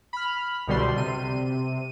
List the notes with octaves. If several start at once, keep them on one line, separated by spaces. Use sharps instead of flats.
B5 F6
C2 B2 D3 G3 C6
C3 D#7